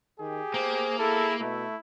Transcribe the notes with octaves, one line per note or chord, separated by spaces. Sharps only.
D#3 G4 G#4
A#3 C5
E4 G#4 A4
B2 A3 E4